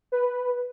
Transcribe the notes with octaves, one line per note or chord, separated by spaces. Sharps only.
B4